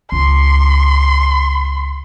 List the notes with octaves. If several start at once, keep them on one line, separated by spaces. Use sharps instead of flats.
C#2 C6